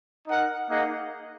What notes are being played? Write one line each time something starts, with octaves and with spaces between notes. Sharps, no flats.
D#4 A#4 F#5
A#3 D#4 G#4 D#5 F#5